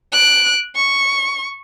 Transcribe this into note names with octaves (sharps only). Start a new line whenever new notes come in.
F#6 D7
C#6